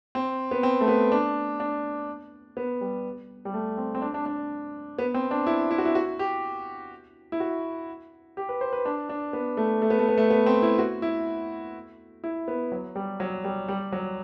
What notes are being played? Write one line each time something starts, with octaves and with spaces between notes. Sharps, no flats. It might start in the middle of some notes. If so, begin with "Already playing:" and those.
C4
B3
C4
A3
B3
D4
D4
B3
G3
G3
A3
C4
C4
D4
D4
D4
B3
C4
D4
E4
E4
F#4
E4
F#4
G4
E4
F#4
G4
B4
C5
B4
D4
D4
B3
A3
A3
B3
A3
B3
A3
B3
C4
E4
F#4
E4
E4
B3
F#3
G3
F#3
G3
G3
F#3